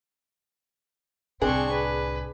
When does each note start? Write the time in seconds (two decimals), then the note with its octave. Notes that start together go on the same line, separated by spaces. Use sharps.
1.42 C2 A2 C4 D4 G#4 C#6
1.72 B4